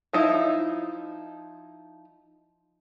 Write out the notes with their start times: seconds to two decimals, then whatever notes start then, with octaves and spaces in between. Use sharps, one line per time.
0.13 F3 D#4 E4